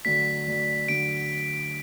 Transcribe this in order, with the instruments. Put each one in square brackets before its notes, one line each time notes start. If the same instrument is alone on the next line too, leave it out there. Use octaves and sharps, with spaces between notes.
[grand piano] D3 F#3 A3 D4 [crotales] B6
[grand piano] D3 F#3 A3 D4
[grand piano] D3 F#3 A3 D4 [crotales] D7